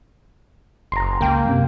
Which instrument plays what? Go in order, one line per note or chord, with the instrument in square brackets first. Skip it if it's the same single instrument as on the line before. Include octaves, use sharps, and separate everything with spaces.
[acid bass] F#1 [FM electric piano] A#5 C6
[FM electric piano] C#2 G5 [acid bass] A#3
[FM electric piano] F#2 C3